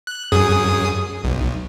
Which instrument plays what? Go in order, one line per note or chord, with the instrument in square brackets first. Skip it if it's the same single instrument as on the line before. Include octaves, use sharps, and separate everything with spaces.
[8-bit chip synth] F#6
F#2 G#4 D#6
B1